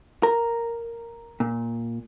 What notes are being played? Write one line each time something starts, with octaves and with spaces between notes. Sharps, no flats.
A#4
A#2